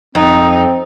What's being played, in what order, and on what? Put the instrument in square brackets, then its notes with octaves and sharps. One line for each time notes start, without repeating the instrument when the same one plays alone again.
[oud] F2 [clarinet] C4 [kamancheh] D#4